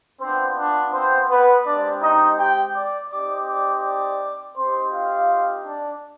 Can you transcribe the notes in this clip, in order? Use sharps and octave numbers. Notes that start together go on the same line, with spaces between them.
B3 C4 D4 F4 C5
D4 D5
C4 C5
B3 B4
G#3 C4 D4 G4 D5
D#4 D#5
G4 G5
D5 D6
C4 D#4 G4 D5 D6
D5 D6
D5 D6
C4 D#4 G4 C5 C6
F4 F5
D4 D5